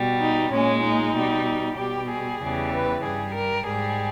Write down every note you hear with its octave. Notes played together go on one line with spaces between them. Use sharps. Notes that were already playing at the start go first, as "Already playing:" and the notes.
Already playing: B2 G3
D#4
A#2 G#3 C#4
D#4
B2 G3
B2 G3 G4
G#4
E2 C#3 E3 G3
B4
G2 G3 G#4
A#4
G#2 G3 G#4